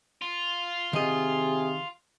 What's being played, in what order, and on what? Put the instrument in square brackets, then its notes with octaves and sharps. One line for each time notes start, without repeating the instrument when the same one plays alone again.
[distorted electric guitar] F4
[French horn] C3 [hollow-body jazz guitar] D#3 D#5 [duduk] G#4